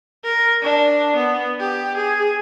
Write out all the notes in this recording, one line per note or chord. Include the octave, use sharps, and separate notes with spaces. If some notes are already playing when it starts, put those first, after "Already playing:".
A#4
D4
B3
G4
G#4